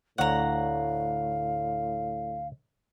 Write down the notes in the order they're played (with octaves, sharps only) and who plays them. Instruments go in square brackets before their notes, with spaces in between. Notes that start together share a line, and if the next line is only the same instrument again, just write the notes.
[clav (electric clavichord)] D2 C#5 D5 [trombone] A2 [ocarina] F5 [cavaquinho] F#5 A#5